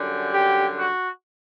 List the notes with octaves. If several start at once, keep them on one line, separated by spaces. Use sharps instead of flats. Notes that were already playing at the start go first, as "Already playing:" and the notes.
Already playing: F#2 D3 G3
G4
F#4